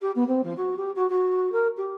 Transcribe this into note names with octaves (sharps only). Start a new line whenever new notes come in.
G4
B3
C4
F3
F#4
G4
F#4
F#4
A#4
G4